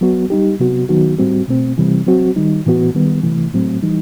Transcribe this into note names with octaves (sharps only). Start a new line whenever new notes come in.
F#3 B3 F#4
G3 D#4 G4
C3 F#3 B3 F#4
D#3 F#3 B3 D#4 F#4
A2 G3 C4 F#4
B2 A3 C4
C3 E3 G3 C4
F#3 C4 F#4
D#3 G3 D#4
A2 E3 B3 F#4
D#3 G3 B3
C3 E3 A3
A2 F#3 A3 C4
E3 G3 D#4